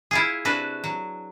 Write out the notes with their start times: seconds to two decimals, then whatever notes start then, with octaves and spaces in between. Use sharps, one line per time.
0.11 E4 F4 G#4
0.45 C3 D4 F#4 B4
0.84 F#3